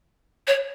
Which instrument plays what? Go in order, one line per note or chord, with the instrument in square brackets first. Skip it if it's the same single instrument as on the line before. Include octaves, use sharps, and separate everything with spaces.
[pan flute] C#5